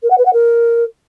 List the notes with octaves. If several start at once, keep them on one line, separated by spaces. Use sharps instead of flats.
A#4
F#5
B4
F#5
A#4